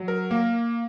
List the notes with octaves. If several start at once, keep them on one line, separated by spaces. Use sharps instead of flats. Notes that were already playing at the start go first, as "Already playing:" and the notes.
Already playing: F#3
A#4
A#3